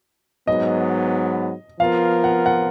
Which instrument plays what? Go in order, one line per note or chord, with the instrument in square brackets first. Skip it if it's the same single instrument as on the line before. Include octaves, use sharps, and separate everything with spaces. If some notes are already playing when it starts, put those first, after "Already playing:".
[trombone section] G#2 F#3 B3 [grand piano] D#5
[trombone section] F3 B3 F4 A#4 [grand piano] F5
[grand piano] F#5
F#5